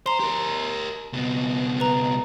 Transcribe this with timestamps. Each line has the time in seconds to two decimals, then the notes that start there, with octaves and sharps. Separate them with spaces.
0.06 C5 A#5 C6
0.20 G4 A#4
1.13 C#2 B2
1.80 B4 A#5